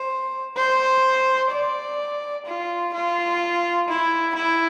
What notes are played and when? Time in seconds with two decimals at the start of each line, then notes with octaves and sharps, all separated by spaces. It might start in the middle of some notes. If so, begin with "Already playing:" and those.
Already playing: C5
0.57 C5
1.52 D5
2.46 F4
2.94 F4
3.88 E4
4.35 E4